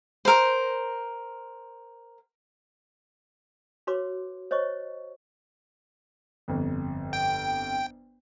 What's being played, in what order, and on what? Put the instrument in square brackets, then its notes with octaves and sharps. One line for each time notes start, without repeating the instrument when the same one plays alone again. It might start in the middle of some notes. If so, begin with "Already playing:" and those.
[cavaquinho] A#4 C5
[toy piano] F#4 B4 C#5 C6 D6
C5 C#5 D#5 C#6
[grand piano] G1 F2
[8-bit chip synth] G5